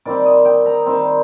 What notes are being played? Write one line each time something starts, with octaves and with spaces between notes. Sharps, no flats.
D#3 G3 C4 D5
D#5
G5
A#5
D#3 G3 C4